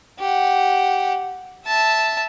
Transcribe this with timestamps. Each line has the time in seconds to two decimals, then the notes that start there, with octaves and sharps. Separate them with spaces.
0.19 G4 F#5
1.66 E5 A5